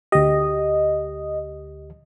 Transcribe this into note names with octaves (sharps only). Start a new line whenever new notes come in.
D2 G4 D#5